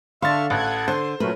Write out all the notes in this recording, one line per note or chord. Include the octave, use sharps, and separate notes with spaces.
D3 D4 E5 F5 C6 C#6 F6 A6
A1 A4 F#5 F#6 G#6
D3 C5 C6
A#2 F#3 A3 C#4 A#4 B4